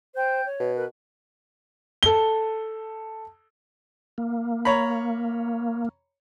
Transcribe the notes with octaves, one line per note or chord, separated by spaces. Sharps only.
C5 G5 G6
C#5
B2
A#4 B4
A4 G7
A#3
C#5 A#5 B5